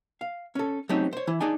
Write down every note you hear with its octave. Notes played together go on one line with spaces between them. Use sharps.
F5
C#4 A4
F#3 A3 C4 C#4 D#4 G4
C5 C#5
E3 E4
D4 D#4 G#4 D5 G#5